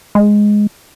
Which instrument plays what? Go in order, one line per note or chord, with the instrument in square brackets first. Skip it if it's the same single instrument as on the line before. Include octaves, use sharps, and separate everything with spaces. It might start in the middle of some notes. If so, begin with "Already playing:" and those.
[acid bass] G#3